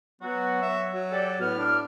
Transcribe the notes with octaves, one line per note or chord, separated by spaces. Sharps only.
F#3 B3 F#4
E5
F#3
G4 A4 D5
A2 B3 F6
D4